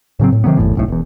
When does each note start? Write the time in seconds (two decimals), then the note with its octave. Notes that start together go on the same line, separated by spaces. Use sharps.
0.20 A2 C#3 F#3 C4
0.32 A2
0.44 C3 D#3 F#3 B3
0.57 G1 E2 A2
0.75 D1 B1 A2
0.88 E1 E2